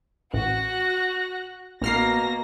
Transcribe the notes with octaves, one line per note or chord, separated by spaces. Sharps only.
A1 F#4 F#6 A#6
A1 B2 A#3 F6 A#6 C7